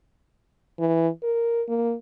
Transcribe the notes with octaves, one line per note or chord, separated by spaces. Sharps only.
E3
A#4
A#3